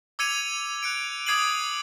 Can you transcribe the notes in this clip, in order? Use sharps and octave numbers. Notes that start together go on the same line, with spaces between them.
D6 E6 G#6 C#7 D#7 F7
F#6 C#7 D7
D6 D#6 G#6 C7 D#7 F#7